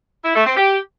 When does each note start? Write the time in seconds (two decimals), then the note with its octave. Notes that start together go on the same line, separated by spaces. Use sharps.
0.24 E4
0.35 A3
0.46 C4
0.57 G4